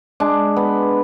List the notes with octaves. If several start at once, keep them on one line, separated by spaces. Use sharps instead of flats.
G#3 D4
B3